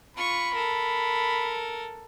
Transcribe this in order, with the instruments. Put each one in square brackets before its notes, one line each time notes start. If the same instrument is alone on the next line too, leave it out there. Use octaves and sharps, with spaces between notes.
[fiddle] F4 C#6 [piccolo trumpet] B5
[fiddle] A4 A#4